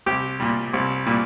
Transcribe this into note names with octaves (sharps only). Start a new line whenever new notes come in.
C2 G4
A#2 G3
C2
A#2 G3